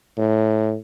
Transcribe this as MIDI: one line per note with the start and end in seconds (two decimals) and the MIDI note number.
0.17 0.76 45